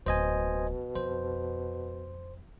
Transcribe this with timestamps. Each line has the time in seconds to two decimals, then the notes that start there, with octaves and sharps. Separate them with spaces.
0.06 D1 B2 C5 D#5 G#5
0.95 F2 C5